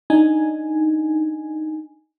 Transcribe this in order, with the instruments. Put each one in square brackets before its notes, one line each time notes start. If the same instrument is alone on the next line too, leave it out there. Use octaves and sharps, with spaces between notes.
[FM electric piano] D4 D#4 G#5